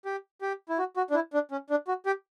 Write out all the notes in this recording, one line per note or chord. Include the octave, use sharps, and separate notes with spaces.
G4
G4
E4
F#4
F#4
D4
E4
D4
C#4
D4
F#4
G4